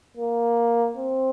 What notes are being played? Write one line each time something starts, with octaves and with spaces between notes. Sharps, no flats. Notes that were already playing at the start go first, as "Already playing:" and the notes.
A#3
C4